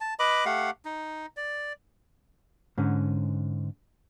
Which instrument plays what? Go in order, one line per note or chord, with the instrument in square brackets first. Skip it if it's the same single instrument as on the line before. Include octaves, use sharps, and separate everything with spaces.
[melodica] A5
B4 D#5 B5 D6
A3 G4 F5 F#5
D#4
D5
[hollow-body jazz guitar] G#2 D3 C#4